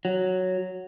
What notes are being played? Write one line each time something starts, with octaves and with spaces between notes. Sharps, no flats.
F#3